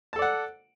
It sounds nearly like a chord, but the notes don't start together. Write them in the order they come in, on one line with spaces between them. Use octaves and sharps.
A5 A4 D5 F#5